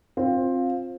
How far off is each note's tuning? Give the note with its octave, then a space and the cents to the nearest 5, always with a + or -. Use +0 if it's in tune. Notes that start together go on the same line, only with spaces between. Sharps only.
C4 +15 F4 +15